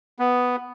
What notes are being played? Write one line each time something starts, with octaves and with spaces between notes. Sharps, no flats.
B3